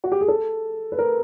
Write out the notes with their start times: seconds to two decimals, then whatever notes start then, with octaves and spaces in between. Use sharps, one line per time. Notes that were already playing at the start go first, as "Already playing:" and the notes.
0.04 F#4
0.12 G4
0.21 G#4
0.28 A4
0.92 B4
0.98 A#4